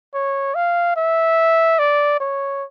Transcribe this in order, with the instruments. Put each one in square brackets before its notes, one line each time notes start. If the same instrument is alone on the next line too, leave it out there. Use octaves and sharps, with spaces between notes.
[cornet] C#5
F5
E5
D5
C#5